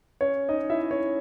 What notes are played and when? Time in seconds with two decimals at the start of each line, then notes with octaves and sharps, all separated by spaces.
0.21 C#4 C#5
0.49 D#4 D#5
0.70 E4 E5
0.91 C#4 C#5